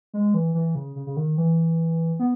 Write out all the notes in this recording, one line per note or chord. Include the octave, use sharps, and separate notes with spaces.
G#3
E3
E3
C#3
C#3
C#3
D#3
E3
B3